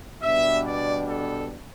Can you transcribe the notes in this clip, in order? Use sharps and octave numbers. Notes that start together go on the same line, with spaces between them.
B2 G3 B3 D4 E5
D5
A4